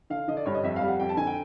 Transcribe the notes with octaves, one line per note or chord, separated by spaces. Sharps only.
D3 F5
D3 D#5
D5
G2 C#5
D#5
F2 E5
F5
G3
F#5
F2 G5
A5
D3 G#5
G5